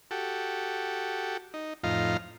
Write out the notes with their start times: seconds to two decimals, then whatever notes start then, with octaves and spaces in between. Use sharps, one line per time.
0.11 F#4 G4 A4
1.54 D#4
1.84 F2 A2 D#4 F4 F5 A#5